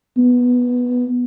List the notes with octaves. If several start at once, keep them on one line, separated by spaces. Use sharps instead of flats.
B3